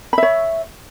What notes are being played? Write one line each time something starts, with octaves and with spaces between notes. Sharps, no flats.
C#5 E5 B5